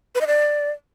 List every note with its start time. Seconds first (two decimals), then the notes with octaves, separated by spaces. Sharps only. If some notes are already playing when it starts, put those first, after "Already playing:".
0.15 B4
0.21 D#5
0.27 D5